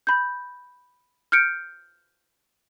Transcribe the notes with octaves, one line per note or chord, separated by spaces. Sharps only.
B5 G6
F6 G6 C#7 D7